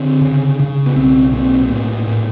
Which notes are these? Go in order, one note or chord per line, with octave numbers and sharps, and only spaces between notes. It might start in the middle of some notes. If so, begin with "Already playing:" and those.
Already playing: D3 C4
C#3
C#3
B3
B1 C4
A#2 C4
A2 B3
A2